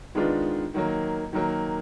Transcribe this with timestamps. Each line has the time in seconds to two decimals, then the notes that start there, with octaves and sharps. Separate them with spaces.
0.15 D#3 G#3 B3 D4 F4
0.74 D#3 F#3 A#3
1.33 D#3 F#3 A#3